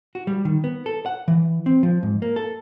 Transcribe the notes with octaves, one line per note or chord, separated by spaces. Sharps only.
F#4
G3
D#3
B3
A4
F#5
E3
C4
F3
G#2
A#3
A4